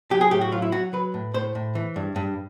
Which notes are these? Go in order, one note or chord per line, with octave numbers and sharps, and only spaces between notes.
F#3 G4
G#4
A2 G4
F#4
F#3 F4
E4
F#3 F#4
F#3 B4
A2
A2 C5
A2
E3
G2
G2